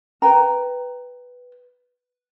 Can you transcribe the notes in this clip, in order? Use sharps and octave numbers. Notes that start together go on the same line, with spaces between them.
B4 G5 A#5